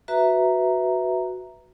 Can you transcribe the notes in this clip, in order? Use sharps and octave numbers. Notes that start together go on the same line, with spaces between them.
F#4 B4 E5 A#5